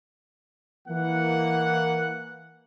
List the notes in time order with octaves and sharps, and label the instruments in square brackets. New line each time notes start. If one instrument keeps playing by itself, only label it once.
[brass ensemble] E3 A#3 F#5